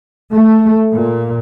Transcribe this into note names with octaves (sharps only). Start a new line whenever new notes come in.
A3
A#2